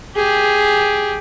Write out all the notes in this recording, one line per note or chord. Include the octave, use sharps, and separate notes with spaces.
G4 G#4